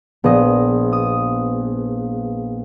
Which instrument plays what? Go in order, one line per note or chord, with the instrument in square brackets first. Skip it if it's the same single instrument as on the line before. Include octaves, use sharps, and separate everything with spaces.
[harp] A#1 D#5 [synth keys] B3 G#4 B4
[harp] D#6